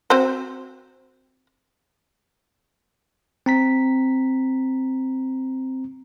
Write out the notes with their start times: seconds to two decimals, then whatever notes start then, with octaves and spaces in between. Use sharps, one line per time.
0.10 C4 F#4 C5
3.46 C4 A#5 B6